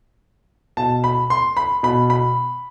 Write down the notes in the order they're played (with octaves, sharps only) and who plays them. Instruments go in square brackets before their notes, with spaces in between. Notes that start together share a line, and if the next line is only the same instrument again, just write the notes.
[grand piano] B2 A5
B5
C6
B5
B2 B5
B5